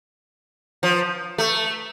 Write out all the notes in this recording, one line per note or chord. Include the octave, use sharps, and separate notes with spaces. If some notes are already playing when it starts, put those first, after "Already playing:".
F3
A3